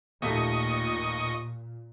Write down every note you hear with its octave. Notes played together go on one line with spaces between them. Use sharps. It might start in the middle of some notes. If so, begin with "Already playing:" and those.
D#2 A#2 A3 D#5 C#6 B6